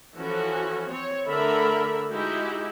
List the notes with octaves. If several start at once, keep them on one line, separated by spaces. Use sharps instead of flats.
E3 F3 C#4 F#4 A4
C4 C#5
D3 A3 A4 A#4 E5 B5
G#3 D#4 E4 F#4 G4